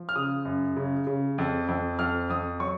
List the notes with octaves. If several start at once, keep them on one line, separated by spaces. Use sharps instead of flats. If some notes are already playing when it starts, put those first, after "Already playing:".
Already playing: F3
F6
C#3 D#6
F#2
C#3
C#3
F2
F2
F2 F6
F2 D#6
F#3 C#6